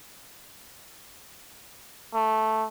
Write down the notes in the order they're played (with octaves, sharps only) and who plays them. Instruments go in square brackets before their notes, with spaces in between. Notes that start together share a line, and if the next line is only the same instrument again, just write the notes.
[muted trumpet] A3